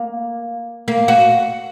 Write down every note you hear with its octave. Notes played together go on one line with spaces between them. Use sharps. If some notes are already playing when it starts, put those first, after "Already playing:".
Already playing: A#3
A#3
F#4